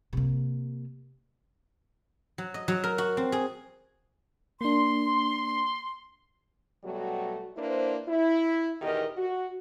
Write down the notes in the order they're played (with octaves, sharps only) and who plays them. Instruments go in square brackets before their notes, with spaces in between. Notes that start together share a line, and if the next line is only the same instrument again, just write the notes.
[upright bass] C3 A#3
[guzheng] F#3
D#5
F#3
A#4
F#4
C4
G#4
[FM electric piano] A#3 D4 [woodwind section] C6
[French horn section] B2 F#3 G3 A3 F#4
A#3 D4 E4 B4 C5
E4
E2 B2 D#3 G4 A#4 D#5
F#4